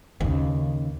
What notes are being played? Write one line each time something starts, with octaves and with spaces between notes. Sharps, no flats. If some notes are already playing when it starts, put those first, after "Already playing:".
D#2 C#3